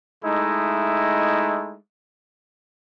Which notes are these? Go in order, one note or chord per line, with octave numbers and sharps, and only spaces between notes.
G#3 A3 D#4 E4